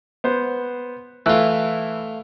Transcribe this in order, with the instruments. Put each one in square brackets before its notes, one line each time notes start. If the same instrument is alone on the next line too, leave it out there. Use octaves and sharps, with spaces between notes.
[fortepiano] B3 C5
[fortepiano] E3 E4 F#6 [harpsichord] A3 F4